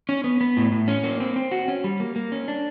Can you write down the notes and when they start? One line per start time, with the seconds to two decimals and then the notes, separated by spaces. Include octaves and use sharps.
0.09 C#4
0.24 B3
0.41 B3
0.57 A2
0.72 A2
0.88 C#4
1.04 A#3
1.20 C4
1.36 C4
1.51 F#4
1.68 C#4
1.84 G3
2.00 A#3
2.16 A#3
2.32 C#4
2.48 D4